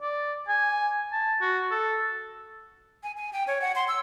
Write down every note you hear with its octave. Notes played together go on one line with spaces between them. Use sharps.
D5
G#5
A5
F#4
A4
G#5
G#5
G5
C#5
F#5
C6
E6